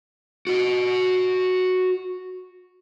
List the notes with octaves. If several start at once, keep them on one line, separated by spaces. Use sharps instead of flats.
F#4 D#5